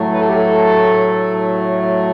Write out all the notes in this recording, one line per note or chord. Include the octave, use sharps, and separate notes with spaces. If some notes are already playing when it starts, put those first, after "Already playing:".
Already playing: A2 F#3 A3
B4
A4
G4
A4